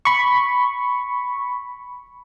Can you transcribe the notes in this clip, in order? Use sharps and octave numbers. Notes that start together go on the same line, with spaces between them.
B5 C#6